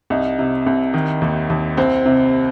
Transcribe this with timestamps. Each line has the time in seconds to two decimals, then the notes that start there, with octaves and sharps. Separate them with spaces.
0.10 C2 D#4
0.39 C3
0.66 C2
0.94 D#3
1.22 D#2
1.50 D#2
1.77 C2 C4
2.06 C3